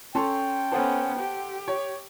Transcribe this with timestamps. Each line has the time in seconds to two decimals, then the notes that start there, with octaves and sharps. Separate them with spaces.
0.15 C#4 A4 G5 C6
0.72 B3 C#4 A4 C5 F#5
1.19 G4
1.68 C#5